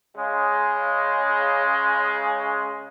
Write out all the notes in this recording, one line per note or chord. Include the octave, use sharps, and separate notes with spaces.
C#3 G#3